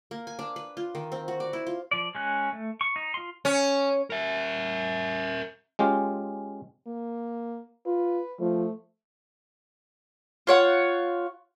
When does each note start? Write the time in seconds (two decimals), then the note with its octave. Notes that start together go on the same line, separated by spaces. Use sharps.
0.11 A#3
0.27 G#5
0.39 D4
0.56 B4
0.77 F4
0.95 D#3
1.12 C4
1.28 F#4
1.40 D5
1.53 E4
1.67 F4
1.91 F3 D5
2.15 G#3 C#4 F#6
2.52 A3
2.81 C#6
2.96 D#4
3.14 F4 C6
3.45 C#4
4.10 A#4 E5
5.79 G#3 C#4 F4 G4
6.87 A#3
7.86 F4 B4
8.40 F3 A3
10.47 F4 C#5 F#5